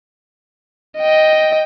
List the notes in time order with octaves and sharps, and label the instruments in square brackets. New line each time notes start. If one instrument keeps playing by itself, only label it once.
[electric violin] D#5 G5